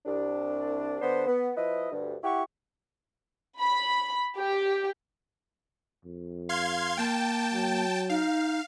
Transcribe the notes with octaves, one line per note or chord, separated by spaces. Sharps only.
C2 D4
D3 B3 D4 C5
B3
F3 E4 B4 D#5
D2 G2
E4 G4 F#5 G5 C#6
B5
G4
F2
F5 C6 G#6
A#3 G5 A5
F#3
D#4 F5